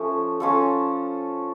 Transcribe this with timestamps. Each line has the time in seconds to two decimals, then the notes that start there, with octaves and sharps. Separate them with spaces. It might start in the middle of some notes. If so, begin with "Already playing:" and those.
Already playing: F3 A3 C#4
0.40 C#4 F4 A4